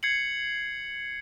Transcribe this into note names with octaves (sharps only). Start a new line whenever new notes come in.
G#6 C7 C#7 F#7